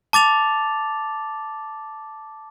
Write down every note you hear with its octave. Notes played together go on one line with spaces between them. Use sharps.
A5 D6 A6 F7